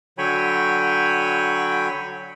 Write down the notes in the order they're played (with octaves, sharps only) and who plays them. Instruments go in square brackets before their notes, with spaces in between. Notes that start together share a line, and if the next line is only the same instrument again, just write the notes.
[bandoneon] D3 F#3 C#5 G5 G#5 B5